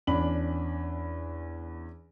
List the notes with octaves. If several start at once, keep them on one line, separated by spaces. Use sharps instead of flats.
E2 C#4 D4 B5 F#7